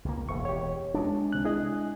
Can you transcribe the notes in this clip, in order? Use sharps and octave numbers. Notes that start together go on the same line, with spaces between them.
C#2 A#3
E1 C#6
G4 C#5
G#3 D4
C2 C3 F#6
E4 G#4 D#5